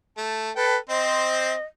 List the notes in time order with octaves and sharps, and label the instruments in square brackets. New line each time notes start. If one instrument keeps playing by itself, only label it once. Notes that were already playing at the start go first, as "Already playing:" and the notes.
[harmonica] A3 [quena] A5
[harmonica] A4 G5 [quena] B4
[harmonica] C4 C5 [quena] D#5